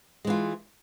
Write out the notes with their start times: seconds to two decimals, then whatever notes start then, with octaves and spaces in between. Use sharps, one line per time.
0.25 G#3
0.27 E3
0.30 F4